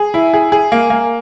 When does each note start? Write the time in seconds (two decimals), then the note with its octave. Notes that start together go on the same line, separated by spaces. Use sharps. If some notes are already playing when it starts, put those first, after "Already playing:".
Already playing: G#4
0.14 E4
0.34 G#4
0.52 G#4
0.72 A#3
0.90 A#3